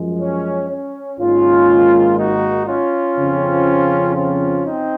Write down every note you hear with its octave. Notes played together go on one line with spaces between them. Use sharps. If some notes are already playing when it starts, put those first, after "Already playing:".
Already playing: F#2 F3 G#3
C#4
C#4
G#1 G#2 D#3 A#3 C#4 F4
D#4 F#4
C#4 F4
F2 C#3 F3 C4
C#4 F4
C4 D#4